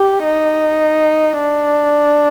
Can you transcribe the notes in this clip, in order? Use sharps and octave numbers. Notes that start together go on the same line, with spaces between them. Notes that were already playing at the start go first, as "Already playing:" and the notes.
Already playing: G4
D#4
D4